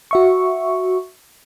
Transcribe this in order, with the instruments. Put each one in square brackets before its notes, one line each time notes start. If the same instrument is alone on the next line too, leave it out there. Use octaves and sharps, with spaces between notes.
[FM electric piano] F#4 E5 C#6